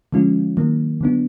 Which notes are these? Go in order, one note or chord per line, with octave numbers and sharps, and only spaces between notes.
D3 F3 G#3 C#4 F4
D#3 F#3 A#3
D3 F#3 B3 D4